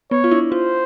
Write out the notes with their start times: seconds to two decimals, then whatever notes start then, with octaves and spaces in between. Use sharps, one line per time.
0.11 B3 C#5
0.24 F4
0.31 D4 E4
0.52 F4 C5